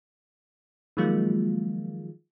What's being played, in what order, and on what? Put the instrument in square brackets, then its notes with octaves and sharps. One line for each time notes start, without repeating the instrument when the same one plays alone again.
[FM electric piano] D#3 F3 F#3 G#3 A#3 F4